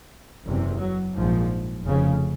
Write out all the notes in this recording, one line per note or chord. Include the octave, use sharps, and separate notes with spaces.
F#1 E2 C3
F#3
A#1 G#2 F3
F1 F2 C#3